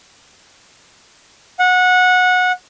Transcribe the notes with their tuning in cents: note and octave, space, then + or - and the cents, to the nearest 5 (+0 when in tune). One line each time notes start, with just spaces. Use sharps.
F#5 -20